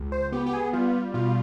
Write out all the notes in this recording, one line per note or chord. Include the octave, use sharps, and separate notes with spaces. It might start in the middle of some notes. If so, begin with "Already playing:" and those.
Already playing: C#2
C5
B3 G4
G4
G#4
G3 F4
B2 F4